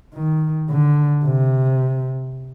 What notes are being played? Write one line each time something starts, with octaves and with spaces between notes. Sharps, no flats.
D#3
D3
C3